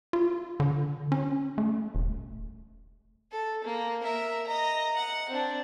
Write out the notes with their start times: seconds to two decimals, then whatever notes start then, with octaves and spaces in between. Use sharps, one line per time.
0.13 F4
0.60 D3
1.12 C#4
1.58 A3
1.95 E1
3.31 A4
3.64 A#3
4.03 A#4 E5
4.47 D#5 A#5
4.96 F#5
5.29 C4 D4